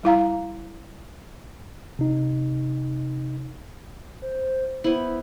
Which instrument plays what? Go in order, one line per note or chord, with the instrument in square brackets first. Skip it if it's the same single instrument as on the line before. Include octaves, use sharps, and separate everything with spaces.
[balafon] G3 E4 F5 A#5
[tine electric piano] C3 D#4
[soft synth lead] C5
[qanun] B3 E4 [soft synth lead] C5